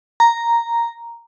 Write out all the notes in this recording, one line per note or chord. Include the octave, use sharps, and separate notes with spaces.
A#5